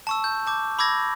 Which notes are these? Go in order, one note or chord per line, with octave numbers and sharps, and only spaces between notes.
A5 C#6 E6
G6
A5 D6 G6
B5 D6 E6 G#6 A#6